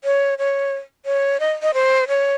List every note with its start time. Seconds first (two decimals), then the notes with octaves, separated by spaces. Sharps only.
0.04 C#5
0.38 C#5
1.06 C#5
1.40 D#5
1.62 D#5
1.74 C5
2.08 C#5